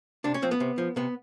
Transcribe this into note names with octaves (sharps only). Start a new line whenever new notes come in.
C3 D4
C#4
F3 C4
B3
C3
F3
C3 B3